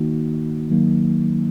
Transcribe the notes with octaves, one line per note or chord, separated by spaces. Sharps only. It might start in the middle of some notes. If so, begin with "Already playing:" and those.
Already playing: D#3 A#3 D#4 F#4
D#3 F#3 A#3 D#4